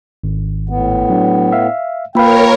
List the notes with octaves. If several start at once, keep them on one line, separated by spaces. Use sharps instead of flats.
G#1
A2 B3
F#3 D4
E5 F5
A#3 F4 A#4 B4 C#5 F5 G5 B5